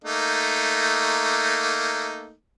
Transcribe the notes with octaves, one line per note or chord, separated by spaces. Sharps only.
A3 A#3 D#4